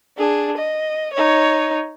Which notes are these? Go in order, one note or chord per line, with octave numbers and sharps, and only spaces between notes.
D4 G#4
D#5
D#4 C#5